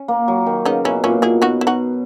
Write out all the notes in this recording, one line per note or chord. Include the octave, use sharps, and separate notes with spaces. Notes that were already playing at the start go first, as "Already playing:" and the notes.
Already playing: C#4
A#3
F#3
D#3
C#3 B3 D#4
B2 C#4 E4
A#2 C#4 E4
B2 E4 G#4
B2 D#4 F#4
E4
D#4 F#4